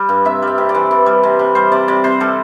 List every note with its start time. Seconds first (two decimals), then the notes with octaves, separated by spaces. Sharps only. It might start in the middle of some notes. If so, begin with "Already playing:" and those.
Already playing: G3
0.09 G2
0.25 C3 E5
0.42 G3 E5
0.58 C3
0.69 D5
0.75 E3
0.91 E3
1.06 G3
1.23 C3
1.39 C3
1.55 G3 C5
1.72 C3 D5
1.88 C3 D5
2.04 C3 C5
2.20 G3 A4